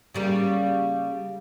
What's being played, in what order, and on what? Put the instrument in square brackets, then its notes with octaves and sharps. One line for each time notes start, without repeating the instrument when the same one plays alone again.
[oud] C#3 G3 A#3